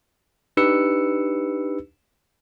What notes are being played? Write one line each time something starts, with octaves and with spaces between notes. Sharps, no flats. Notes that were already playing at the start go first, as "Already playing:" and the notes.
D4 D#4 G4 B4 E6 C#7